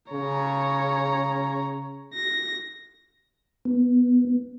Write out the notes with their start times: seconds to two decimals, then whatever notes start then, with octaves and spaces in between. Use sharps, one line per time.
0.13 C#3 C#5 A#5
2.14 A#6
3.65 B3